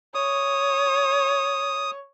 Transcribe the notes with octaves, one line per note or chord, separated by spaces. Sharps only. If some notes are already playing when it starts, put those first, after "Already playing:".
C#5 D#6